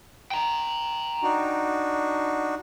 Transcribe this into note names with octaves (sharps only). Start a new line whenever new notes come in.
G5 A#5
D4 D#4 F#4